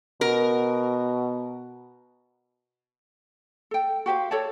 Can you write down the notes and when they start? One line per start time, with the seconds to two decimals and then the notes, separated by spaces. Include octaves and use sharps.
0.21 B2 A#4
3.71 A4 G5
4.06 F#4 G4 C5 F5
4.31 A4 C#5 D5 A5